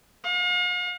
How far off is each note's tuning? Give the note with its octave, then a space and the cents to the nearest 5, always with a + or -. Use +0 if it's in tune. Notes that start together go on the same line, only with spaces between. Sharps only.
F5 +45